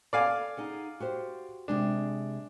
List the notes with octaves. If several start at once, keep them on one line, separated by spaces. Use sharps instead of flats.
A4 D5 F5 G#5
D#4 G#4 F#5
F#4 G4 C5
C3 G#3 D4 G#4